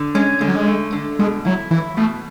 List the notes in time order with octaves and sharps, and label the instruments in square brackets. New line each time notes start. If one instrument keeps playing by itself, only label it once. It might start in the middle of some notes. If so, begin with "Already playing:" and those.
Already playing: [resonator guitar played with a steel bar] D3
[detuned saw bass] G#3 [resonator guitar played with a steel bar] C#4
[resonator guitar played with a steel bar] D3 [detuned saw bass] G#3
[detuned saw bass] F#3
G#3
[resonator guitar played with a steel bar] A3
D3
[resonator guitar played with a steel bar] B2 [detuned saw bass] G#3
[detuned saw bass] F#3 [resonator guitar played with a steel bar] E4
[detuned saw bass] E3 [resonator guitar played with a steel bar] E4
[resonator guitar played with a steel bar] B2 [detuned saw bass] A3